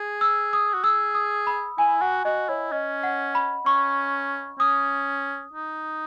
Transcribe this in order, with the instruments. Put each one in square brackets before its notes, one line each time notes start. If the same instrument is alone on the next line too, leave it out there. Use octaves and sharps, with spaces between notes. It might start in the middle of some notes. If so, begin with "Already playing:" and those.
Already playing: [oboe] G#4
[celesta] E6
D#6
[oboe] F#4
[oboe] G#4 [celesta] E6
[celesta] D#6
B5
[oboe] E4 [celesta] G#5
[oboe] F#4 [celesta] F#5
[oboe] F#4 [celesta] D#5
[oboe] E4 [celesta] C#5
[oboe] C#4 [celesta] D#5
[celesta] F#5
B5
[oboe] C#4 [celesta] C#6
[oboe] C#4 [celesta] D#6
[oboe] D#4